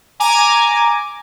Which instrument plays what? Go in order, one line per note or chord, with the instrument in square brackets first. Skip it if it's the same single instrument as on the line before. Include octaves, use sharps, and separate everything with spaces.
[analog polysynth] G#5 A#5 D6